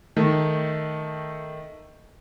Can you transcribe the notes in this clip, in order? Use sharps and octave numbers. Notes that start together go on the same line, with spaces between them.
D#3 A3